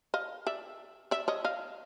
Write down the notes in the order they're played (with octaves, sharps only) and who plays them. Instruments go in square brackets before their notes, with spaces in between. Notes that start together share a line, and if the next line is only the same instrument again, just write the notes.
[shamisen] D#5 F5
D5 E5
D5 E5
C#5 D#5
D#5 F5